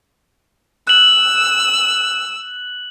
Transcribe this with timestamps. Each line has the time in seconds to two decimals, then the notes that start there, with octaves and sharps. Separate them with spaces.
0.87 E6 F#6 F#7